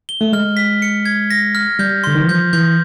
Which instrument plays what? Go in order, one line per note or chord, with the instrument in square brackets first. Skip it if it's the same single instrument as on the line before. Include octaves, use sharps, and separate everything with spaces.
[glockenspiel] G7
[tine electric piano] A3
[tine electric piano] G#3 [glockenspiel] F6
[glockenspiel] B6
C#7
G#6
A#6
F6
[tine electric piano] G3 [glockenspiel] G6
[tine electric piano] D3 [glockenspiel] C6
[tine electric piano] D#3
E3
[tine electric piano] F3 [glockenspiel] G6
[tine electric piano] E3 [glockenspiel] G6